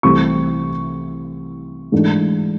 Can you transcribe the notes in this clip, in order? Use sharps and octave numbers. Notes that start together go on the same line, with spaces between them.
C2 C3 E3 A3 C4 C#6
G#2 E3 A3 D4